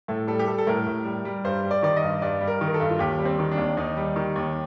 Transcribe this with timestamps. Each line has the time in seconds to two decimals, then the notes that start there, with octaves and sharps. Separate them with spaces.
0.08 A2 A4
0.27 G3 A4
0.39 G4
0.47 G3 A4
0.58 A4
0.67 A2 A#4
0.87 A2
1.05 G3
1.25 G3
1.44 G2 C5
1.64 G3
1.71 D5
1.83 D#3 D5
1.97 D#5
2.02 G2
2.22 G2 D5
2.41 G3
2.47 A#4
2.61 D#3
2.68 A#4
2.74 A4
2.80 G2
2.89 F4
2.99 D#2 G4
3.19 G3
3.25 C4
3.39 D#3
3.51 D4
3.57 D#2
3.77 D#2 D#4
3.97 G3
4.16 D#3
4.36 D#2